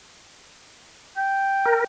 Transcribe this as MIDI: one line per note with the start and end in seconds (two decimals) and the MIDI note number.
1.17 1.85 79
1.65 1.84 70